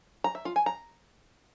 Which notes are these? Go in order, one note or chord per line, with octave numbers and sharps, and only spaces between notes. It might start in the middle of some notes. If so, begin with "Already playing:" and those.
A#5
E5
F4
G#5
A#5